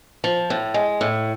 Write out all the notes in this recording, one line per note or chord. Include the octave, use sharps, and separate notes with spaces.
F3
A2
G#3
A2